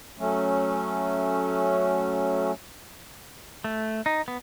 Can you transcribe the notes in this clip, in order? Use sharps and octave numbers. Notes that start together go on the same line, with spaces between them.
F#3 A3 C#4
A3
D#4
B3